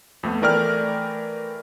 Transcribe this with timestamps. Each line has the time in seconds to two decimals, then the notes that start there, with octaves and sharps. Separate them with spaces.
0.23 F2 A3 B3
0.42 E3 A3 A#4 D5 G5 F6